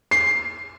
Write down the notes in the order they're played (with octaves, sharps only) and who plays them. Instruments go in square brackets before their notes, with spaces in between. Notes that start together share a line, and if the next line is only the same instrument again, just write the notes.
[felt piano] C7